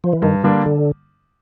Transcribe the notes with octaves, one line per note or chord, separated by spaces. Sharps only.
F3
E3
G2 D#3
D3 G3 A#3 D4
D3